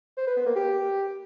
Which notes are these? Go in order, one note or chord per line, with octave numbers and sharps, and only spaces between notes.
C5
B4
B3
A#3
G4